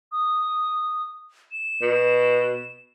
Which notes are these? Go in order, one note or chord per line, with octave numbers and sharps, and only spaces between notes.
D#6
E7
B2